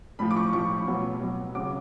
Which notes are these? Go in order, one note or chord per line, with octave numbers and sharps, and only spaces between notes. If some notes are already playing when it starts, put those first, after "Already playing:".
A2 F3 B5
D6
C#6
A2 F3 C#6
B2 F#3
B2 F#3
C#3 F#3 D6